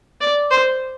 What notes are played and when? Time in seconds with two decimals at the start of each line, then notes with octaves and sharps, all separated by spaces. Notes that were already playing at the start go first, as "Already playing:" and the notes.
0.21 D5
0.51 C5